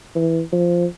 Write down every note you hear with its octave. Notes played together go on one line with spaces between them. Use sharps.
E3
F3